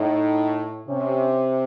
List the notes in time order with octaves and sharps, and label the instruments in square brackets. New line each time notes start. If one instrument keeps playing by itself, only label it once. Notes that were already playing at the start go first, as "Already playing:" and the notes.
Already playing: [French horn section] A2 [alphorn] D#4
[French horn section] C3 [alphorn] C#4